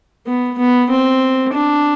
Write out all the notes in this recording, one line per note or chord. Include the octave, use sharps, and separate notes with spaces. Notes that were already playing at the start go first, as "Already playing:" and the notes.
B3
B3
C4
D4